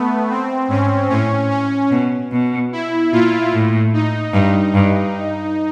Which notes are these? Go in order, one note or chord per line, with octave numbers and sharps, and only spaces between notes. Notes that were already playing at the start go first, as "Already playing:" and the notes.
Already playing: A3 B3
C4
G#2 C#4
A2 C#4
C#4
B2
B2
E4
A#2 F4
A2
D#4
G2 D#4
G2